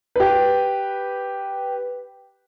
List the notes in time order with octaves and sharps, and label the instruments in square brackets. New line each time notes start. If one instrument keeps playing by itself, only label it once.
[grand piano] G4 B4